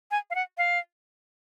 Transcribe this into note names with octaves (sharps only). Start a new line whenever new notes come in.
G#5
F5
F#5
F5